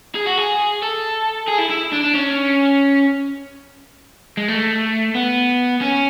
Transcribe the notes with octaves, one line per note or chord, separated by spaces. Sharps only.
G#4
F#4
G#4
A4
G#4
E4
E4
D4
D4
C#4
G#3
A3
B3
C#4